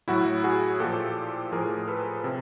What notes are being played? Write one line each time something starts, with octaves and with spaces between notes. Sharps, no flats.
A2 F#3 E4 F#4
F#4 G#4
A#2 F3 G4 A4
A2 F3 G#4 A#4
A4 B4
C3